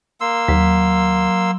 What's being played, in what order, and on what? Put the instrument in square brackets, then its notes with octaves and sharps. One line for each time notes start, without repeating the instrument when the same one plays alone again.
[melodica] A#3 C6 E6
[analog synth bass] D#2 [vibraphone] F#3